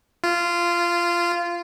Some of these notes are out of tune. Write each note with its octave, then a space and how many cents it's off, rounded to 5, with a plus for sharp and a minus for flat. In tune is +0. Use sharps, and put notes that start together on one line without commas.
F4 -15